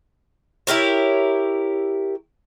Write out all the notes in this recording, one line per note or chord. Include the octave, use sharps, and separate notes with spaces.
E4 G4 A#4 C#5